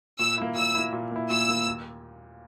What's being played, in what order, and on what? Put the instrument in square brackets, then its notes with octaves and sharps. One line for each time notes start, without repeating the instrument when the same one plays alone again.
[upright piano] A#2 [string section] E6
[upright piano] A#3 E4
[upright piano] A#2 [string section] E6
[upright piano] A#3 E4
A#2
A#3 E4
[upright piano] A#2 [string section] E6
[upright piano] A#3 E4
D#2